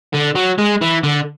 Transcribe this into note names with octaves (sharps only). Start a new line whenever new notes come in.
D3
F#3
G#3
E3
D3